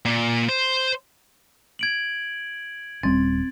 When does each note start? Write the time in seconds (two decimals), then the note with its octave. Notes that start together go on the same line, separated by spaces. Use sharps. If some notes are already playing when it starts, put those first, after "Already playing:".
0.05 A#2
0.49 C5
1.79 G#6 D7 F#7
3.03 D#1 G3 C4 C#4 A6